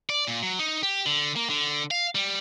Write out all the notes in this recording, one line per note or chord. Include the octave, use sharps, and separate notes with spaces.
D5
A#2
F#3
D#4
G4
D3
A#3
D3
F5
G3